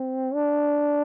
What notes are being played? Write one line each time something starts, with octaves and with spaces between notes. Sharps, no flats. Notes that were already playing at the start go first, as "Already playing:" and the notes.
Already playing: C4
D4